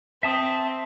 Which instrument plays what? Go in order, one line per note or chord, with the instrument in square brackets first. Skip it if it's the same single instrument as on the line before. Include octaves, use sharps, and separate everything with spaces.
[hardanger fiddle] C4 [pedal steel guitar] E5 A5 D#6